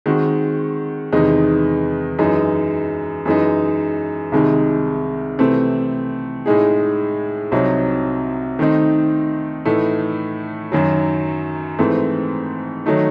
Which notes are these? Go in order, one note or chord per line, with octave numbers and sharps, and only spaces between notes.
D#3 G#3 C4 F#4
E2 C3 D#3 G#3 D#4
F#2 E3 G#3 D#4
F#2 E3 G#3 D#4
C2 C3 D#3 G#3 D#4
C3 E3 A3 C4
A2 G#3 D#4 G#4
C2 C3 F#3 C4 D#4
D#3 A3 C4 D#4
A2 E3 A3 D#4
F#2 D#3 F#3
G#2 E3 A3 C4
D#3 F#3 A3 D#4